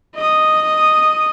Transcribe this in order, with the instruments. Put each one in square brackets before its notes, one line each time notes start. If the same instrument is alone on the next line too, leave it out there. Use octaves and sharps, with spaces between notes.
[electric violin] D#5 D#6